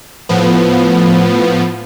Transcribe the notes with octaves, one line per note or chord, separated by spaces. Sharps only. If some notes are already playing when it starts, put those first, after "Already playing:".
A2 F3 B3